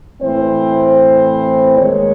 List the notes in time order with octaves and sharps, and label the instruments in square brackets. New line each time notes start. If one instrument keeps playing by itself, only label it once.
[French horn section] A2 E3 C4 C5
D#2 D#3 G#3 C#5